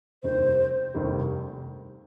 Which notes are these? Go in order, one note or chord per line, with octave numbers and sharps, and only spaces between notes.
F1 D#2 D#3 G3 C5
F1 D#2 D#3 G3